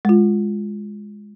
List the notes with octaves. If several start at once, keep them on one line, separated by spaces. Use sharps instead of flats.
G#3 F4